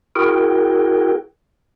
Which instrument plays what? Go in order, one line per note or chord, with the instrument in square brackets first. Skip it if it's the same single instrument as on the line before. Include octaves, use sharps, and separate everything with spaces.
[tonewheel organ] E4 F#4 G#4 A#4 G5